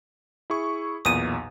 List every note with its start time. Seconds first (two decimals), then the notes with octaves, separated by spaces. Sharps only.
0.50 E4 G#4 C#6
1.05 B1 E2 A#2 D#6 D#7